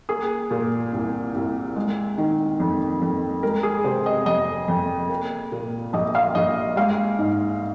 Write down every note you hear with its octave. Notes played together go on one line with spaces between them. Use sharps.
A#3 G#4
A#2
C2
C2
G#3
D#3
F2
F2
G#3 A#4
G#4
C3 C5
D#5
F2 D#5
F2
A#3
A#2
A#1 D#5
F5
A#1 D#5
G#3 F5
G#2